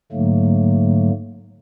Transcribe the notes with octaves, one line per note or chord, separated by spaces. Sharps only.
G#2 D3 F#3 A3 A#3